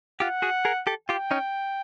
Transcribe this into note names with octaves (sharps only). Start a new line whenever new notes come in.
F4 G4 F#5
F#4 G#4
G#4 A#4
G4 A4
F4 G4 G5
C#4 D#4